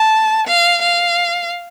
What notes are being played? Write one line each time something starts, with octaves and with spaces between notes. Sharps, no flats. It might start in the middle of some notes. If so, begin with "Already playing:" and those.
Already playing: A5
F5
F5